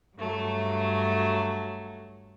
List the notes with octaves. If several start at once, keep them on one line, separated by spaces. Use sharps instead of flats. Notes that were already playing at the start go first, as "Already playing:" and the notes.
G2 F#3 A3